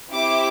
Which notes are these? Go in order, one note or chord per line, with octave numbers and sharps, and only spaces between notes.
C4 E4 G4 D6